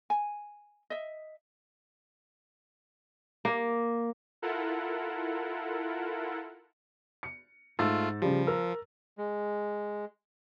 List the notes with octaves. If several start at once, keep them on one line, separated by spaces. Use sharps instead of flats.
G#5
D#5 E5
A#3
E4 F4 A4 A#4 F#5
C#7
G#2 A3 F4 E6 A6
C#3 F3 G3
A#4 E6
G#3